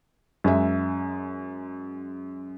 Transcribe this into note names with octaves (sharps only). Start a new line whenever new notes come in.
F#2 G#3 E5